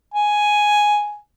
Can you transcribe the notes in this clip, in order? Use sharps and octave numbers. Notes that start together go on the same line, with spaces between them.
G#5